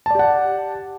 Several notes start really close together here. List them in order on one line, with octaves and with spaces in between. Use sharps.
A5 D5 G4 F#5